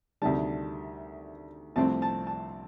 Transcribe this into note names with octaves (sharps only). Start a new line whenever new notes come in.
D2 C3 D#3 G3 A5
C2 C3 F3 A3 C4 A5
A5
A5